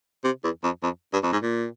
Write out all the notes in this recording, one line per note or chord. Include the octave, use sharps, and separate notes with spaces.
C3
E2
F2
F2
G2
F2
G#2
A#2